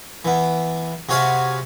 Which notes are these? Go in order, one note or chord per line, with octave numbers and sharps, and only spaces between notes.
E3 B3
C3 F#4 G#4 C#5 F5 B5